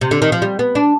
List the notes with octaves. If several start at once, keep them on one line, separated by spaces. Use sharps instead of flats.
C3
D3
D#3
F3
G3
B3
D4